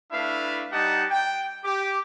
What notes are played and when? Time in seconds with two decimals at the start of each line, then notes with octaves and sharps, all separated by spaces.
0.12 A3 D4 E4 B4 E5 F5
0.72 G3 D#4 G4 D#5 F#5 A5
1.10 G5
1.64 G4 D6